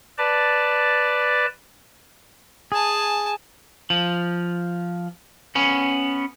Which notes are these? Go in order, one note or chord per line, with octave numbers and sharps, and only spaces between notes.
B4 D5 A5
G#4 G#5 A5
F3
B3 C#4